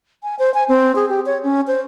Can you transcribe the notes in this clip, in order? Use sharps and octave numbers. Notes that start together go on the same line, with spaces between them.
G#5
C5
G#5
C4
G#4
G4
C#5
C#4
C5